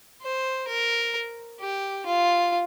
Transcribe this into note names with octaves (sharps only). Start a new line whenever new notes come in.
C5
A#4
G4
F4